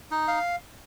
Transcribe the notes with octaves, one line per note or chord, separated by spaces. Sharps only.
D#4
F5